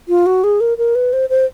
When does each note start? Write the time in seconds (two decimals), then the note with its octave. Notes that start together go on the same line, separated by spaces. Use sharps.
0.09 F4
0.26 F#4
0.44 G#4
0.60 A#4
0.78 A#4
0.95 B4
1.13 C5
1.30 C5